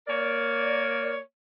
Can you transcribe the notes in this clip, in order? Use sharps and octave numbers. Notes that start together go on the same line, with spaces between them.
A#3 A#4 C#5 D5